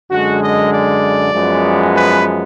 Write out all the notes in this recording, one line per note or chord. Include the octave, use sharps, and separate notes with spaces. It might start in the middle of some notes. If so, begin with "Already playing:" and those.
F#2 D3 G#3 F#4
D#5
D5
F#2 F3 G#3 B3
B4